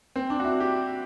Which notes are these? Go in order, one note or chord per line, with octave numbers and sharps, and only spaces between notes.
C4
D4
F#4
E4
G4